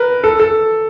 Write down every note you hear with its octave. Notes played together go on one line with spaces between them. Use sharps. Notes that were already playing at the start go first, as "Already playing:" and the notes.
Already playing: A#4 B4
A4
A4